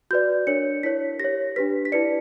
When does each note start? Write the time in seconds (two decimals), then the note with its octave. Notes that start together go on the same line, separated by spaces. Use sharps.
0.11 F#4 B4 D5 G6
0.47 D4 A#4 C#5 C#7
0.83 E4 A#4 C#5 B6
1.20 G4 C#5 A#6
1.56 D4 G4 B4 B6
1.85 B6
1.92 E4 B4 D5 C#7